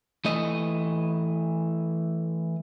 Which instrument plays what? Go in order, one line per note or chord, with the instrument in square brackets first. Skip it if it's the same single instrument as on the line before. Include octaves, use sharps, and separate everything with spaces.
[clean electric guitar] E3 A3 D#5